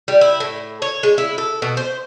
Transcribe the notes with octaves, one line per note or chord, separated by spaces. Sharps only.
G3
E4
A2
C#5
G#3
E4
A4
B2
C5